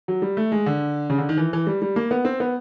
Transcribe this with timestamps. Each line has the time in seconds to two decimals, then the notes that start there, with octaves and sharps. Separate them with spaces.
0.08 F#3
0.22 G3
0.37 A3
0.52 G#3
0.66 D3
1.10 C#3
1.18 D3
1.29 D#3
1.38 E3
1.53 E3
1.67 G3
1.82 G3
1.96 A#3
2.11 B3
2.25 C4
2.40 B3